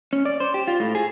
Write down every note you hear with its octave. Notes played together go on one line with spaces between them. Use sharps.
C#4
D5
C5
G4
F4
A2
G#4